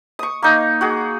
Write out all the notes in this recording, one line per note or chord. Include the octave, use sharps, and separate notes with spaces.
C#6 D#6
A#3 D#4
F#4 G#4